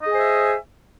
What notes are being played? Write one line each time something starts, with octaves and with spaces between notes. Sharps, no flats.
G#4 C5 D#5 E5 G#5